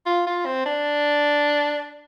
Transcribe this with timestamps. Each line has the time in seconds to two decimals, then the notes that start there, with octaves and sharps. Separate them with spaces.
0.06 F4
0.27 F4
0.46 C4
0.66 D4